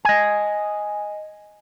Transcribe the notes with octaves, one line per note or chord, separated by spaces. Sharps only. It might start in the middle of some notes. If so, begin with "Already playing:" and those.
D#5 G#5